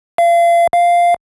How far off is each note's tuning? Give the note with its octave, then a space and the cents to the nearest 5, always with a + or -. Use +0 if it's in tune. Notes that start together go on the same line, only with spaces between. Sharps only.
F5 -35
F5 -5